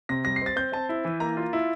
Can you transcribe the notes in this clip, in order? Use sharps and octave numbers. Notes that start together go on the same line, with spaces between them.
C3 A#6
G3 A#6
C7
C4 A6
C4 G6
C4 A5
E4
E3
A#3 A#5
F4
E4